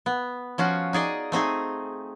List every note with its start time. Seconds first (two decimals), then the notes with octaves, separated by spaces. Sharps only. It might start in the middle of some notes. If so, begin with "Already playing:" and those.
0.06 B3
0.58 F3 C#4 F4 F#4
0.93 D#4 G#4 D5 D#5
1.32 A3 C4 D#4 G#4